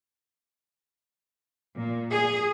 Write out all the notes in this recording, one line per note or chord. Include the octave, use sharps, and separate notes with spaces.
A#2
G#4